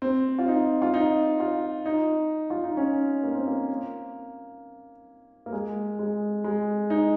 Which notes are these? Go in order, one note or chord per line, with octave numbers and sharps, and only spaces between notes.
C4
F4
D#4
F4
D#4
F4
D#4
F4
D#4
C#4
A#3
C4
A#3
A#3
G#3
G#3
G#3
D#4